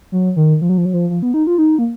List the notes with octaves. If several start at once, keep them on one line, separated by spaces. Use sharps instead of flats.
F#3
D#3
F3
F#3
F3
F#3
F3
F3
B3
D#4
F4
D#4
A#3